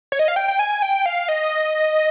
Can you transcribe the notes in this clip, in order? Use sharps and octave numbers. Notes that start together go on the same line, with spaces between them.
C#5
D#5
F5
G5
G5
G#5
G5
F5
D#5